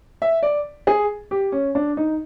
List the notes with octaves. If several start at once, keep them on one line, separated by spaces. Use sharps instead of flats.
E5
D5
G#4
G4
C#4
D4
D#4